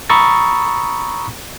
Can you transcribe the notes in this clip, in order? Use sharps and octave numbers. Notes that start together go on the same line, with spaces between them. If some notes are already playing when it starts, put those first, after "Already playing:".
A#5 B5 C#6 D#6 E6 A6